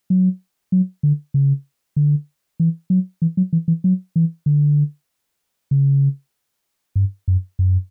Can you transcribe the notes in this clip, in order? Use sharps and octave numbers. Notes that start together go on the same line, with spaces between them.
F#3
F#3
D3
C#3
D3
E3
F#3
E3
F#3
E3
E3
F#3
E3
D3
C#3
G2
F#2
F#2